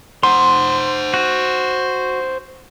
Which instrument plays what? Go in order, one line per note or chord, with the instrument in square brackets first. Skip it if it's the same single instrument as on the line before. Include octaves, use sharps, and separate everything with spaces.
[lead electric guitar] C5 F#5 [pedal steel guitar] C6
[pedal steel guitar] F#4